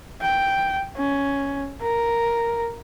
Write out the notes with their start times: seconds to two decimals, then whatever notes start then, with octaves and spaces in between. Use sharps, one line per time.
0.21 G5
0.97 C#4
1.81 A#4